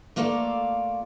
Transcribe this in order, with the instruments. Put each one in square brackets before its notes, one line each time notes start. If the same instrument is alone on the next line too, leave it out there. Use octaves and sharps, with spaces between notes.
[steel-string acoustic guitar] A3 A#3 F4 A4 D5 F5